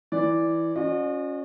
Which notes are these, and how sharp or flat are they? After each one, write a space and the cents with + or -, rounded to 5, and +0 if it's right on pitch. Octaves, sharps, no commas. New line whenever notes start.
E3 +0 D5 -5
C#4 +0 F#4 -45 D#5 -40